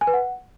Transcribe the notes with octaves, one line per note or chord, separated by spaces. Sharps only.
G#5
B4
F#5